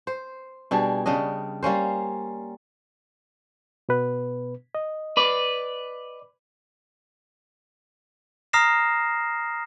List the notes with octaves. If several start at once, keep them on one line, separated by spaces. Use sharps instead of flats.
C5
B2 G3 D4 G#4
C#3 G3 D4 D#5
G3 A#3 C#4 C5
B2 B3 B4
D#5
B4 D5
A#5 D#6 F6 A#6 C7 E7